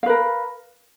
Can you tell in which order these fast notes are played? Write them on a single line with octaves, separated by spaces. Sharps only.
F5 B4 A#4